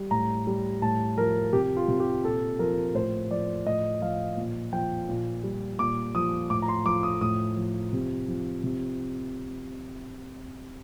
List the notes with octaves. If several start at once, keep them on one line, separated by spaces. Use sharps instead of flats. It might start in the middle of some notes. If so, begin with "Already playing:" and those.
Already playing: G3
A2 A#5
G3
A2 A5
F3 A#4
C3 G4
F4
C3
G4
A#2 A4
F3 A#4
A2 C5
F3 D5
A2 D#5
F3 F5
A#2
F3 G5
A#2
G3
A#2 D6
F3 D#6
A2 D6
A#5
C6
F3 D6
D#6
A2 D#6
F3
C3
F3
C3